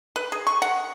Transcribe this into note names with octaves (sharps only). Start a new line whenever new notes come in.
B4
G#4
C#6
F#5